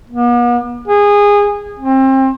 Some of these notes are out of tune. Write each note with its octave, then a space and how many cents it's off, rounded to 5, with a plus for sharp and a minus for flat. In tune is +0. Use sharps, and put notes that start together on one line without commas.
B3 -45
G#4 -20
C4 +30